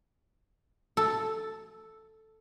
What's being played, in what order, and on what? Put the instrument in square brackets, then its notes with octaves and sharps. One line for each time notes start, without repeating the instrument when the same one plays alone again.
[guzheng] A4